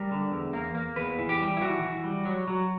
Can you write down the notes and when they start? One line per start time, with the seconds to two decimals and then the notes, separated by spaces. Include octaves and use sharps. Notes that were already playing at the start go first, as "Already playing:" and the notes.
Already playing: G3 A#4
0.11 D3
0.32 E2
0.53 A#3
0.75 A#3
0.96 E2 B4
1.19 E3
1.29 G4
1.40 G3
1.57 E4
1.61 E3 F#4
1.82 E3
2.04 G3
2.25 F#3
2.48 F#3